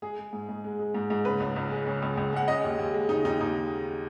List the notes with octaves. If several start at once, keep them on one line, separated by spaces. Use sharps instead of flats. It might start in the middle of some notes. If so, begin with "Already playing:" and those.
G#3 G#4
G#3
G#2
G#2
G#3
G#3
G#2
G#2
C#3 B4
C#2
C#2
G#3
C#3
C#2
C#2
G#3 F#5
C#3 D#5
D#2
D#2
G#3
C#3 D#4
D#2 D#4
D#2 D#4